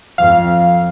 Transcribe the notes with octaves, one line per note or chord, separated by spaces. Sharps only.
F2 F5